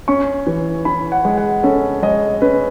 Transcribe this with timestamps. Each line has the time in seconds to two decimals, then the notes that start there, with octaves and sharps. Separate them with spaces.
0.08 C#4 C#6
0.47 E3
0.85 E3 B5
1.12 F#5
1.25 G#3
1.38 F#5
1.63 C#4 A4
2.02 G#3 D#5
2.42 C#4 B4